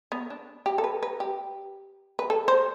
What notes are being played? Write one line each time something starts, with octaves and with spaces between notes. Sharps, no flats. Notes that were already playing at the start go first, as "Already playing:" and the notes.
B3
D4
G4
A4
B4
B4
G4
B4
A4
C5